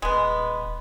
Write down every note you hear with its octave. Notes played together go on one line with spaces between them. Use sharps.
D#1 G#3 B3